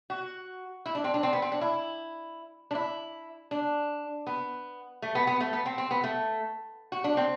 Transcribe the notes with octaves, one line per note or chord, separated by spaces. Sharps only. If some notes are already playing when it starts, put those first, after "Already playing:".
F#4
E4
D4
C4
D4
C4
B3
C4
D4
E4
D4
E4
D4
B3
A3
B3
B3
A3
B3
C4
C4
B3
A3
F#4
D4
C4